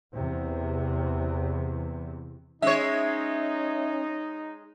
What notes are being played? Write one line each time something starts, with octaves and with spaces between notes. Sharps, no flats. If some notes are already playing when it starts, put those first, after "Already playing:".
E2 C3
G#3 C#4 D#4 C#5 E5